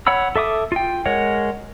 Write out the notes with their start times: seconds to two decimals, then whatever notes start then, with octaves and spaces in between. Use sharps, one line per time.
0.07 C#5 F#5 B5 E6
0.36 A4 E5 D6 D#6
0.72 F4 G5
1.06 G#3 A#4 C#5 F#5